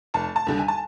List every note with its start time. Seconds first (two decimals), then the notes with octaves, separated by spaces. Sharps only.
0.14 F1 A5
0.36 A5
0.47 D#2 D3 G3
0.58 G#5
0.68 A5